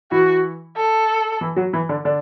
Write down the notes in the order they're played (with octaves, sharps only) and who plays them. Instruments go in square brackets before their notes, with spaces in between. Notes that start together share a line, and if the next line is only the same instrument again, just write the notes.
[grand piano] E3 E4 [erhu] F#4
[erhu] A4
[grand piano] E3 E4
F#3 F#4
E3 E4
D3 D4
D3 D4